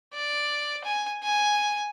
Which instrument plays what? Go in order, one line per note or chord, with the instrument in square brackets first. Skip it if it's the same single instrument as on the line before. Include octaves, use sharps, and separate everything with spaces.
[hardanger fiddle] D5
G#5
G#5